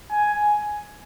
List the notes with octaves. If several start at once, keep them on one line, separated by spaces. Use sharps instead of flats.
G#5